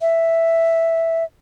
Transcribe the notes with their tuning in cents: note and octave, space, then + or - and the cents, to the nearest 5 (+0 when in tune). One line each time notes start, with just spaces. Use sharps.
E5 +0